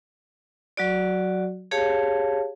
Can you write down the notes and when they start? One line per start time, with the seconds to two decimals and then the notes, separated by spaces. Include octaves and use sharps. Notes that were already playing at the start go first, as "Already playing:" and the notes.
0.77 F#3 F#4 D5
1.71 G4 G#4 C#5 F5 A5